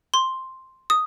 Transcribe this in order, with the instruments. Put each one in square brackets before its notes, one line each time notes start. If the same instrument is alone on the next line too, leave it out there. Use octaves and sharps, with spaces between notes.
[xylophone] C6
D#6